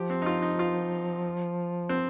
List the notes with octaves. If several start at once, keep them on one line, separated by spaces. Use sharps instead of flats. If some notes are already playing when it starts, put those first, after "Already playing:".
Already playing: F3 G4
C4
D#4
F4
D#4
F4
C4